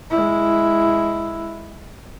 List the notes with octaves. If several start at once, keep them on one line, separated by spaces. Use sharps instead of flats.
G#3 E4